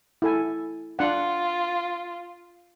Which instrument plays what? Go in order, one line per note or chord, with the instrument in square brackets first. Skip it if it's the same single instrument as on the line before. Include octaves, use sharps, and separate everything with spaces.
[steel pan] E4 A4 G#5
[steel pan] D4 F#5 [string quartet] F4